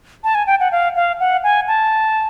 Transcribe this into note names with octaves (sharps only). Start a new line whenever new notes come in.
A5
G#5
G5
F#5
F5
F5
F#5
G#5
A5